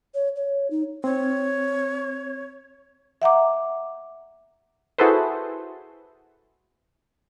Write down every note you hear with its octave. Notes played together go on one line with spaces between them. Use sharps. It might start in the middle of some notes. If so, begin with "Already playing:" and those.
C#5
C#5
D#4
C4 C#5
E5 F#5 A#5 D6
E4 F#4 G#4 A4 B4 C5